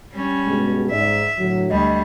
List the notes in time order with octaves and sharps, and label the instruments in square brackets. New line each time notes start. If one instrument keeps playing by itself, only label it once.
[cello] G3 C#4
[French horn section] G2 B2 G#3
[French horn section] G#2 D5 [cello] E5
[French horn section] A2 D3 F#3
[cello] D2 G3 [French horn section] D#5